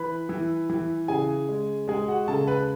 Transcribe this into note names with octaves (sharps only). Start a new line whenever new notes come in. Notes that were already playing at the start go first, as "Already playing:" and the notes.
Already playing: E3 B4 B5
E3
E3
C#3 G#4 G#5
G#3
G#3 G#4 G#5
F#4 F#5
C#3 A4 A5
B4 B5